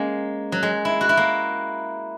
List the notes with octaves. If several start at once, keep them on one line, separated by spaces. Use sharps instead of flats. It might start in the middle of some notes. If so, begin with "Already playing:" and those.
Already playing: G#3 A#3 C#4
F#3
G#3
E4
F#4
E4
A#3